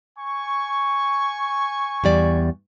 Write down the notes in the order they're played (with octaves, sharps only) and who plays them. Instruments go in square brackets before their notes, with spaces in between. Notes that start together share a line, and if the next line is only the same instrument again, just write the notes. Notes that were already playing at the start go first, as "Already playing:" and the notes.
[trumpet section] G#5 C#6
[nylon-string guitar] E2 G3 D5